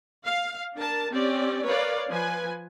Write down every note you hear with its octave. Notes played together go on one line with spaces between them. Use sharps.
F5
D4 A#4 A5
C4 C#4 G4 D5
A#4 B4 C#5 D5 F5
F3 B4 G#5